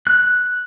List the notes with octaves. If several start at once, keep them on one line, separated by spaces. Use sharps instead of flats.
F#6